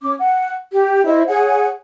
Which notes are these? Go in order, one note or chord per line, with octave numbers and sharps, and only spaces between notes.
C#4 D6
F#5
G4
E4 C5 D#5
G#4 C#5 F#5 G#5